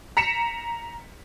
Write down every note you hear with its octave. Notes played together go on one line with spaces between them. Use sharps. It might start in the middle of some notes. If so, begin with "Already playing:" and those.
A#5 B6 C#7 E7